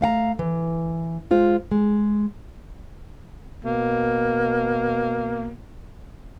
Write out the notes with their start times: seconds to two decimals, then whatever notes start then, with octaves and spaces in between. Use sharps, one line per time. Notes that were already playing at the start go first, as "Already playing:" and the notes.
0.01 A3 F5 F#5 A#5
0.39 E3
1.31 G#3 F4 C5
1.71 G#3
3.65 B2 A#3